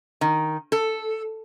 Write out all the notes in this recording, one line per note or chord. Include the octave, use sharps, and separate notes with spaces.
D#3
A4